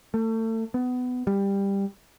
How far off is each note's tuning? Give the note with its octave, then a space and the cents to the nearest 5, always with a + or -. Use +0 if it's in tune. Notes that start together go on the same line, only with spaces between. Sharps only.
A3 +30
B3 +20
G3 +15